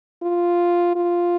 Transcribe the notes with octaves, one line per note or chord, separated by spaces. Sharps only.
F4
F4